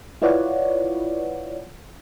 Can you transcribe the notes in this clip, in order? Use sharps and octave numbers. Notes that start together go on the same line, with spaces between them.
E4 F4 B4 C#5 D5 F#5